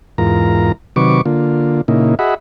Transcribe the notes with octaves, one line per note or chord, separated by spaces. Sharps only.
E2 G#2 F4 A#4 A#5
C3 D#3 F#3 B4 C#6 D6
D3 A#3 F4
A#2 C#3 A#3 D#4 E4
F#4 G#4 D#5 E5 F#5 B5